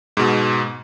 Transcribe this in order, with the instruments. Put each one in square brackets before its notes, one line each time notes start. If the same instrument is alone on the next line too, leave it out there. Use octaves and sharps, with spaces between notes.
[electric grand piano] G#2 B2